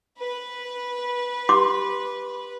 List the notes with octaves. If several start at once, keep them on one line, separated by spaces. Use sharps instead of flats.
B4
G4 C6 D6